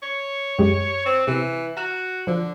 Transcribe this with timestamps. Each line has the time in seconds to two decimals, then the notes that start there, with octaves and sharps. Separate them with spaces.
0.03 C#5
0.58 F#2 G#3 G4
1.06 C4
1.27 C3 E3 C7
1.77 F#4 A#5 F6 E7
2.27 D3 F3